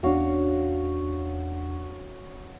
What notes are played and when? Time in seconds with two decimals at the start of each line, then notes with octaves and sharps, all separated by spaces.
0.03 E2 C#4 D4 F#4 F5